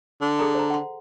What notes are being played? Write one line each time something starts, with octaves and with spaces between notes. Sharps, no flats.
D3
G#4 A4 A#5
C5 A#5
F#5 C6